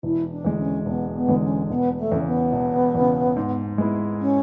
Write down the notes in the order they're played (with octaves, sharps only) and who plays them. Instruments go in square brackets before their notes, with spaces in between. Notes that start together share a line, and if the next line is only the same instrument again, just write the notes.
[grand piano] E1 [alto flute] E4
[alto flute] D4
[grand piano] E2 D3 G#3
[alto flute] C#4
[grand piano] E1 [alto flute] B3
[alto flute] B3
[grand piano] E2 D3 G#3
[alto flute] C#4
[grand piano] E1 [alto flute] B3
[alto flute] A3
[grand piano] E2 C#3
[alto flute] B3
[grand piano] E1
E2 C#3
G#2
G#3 B3 E4
[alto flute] C#4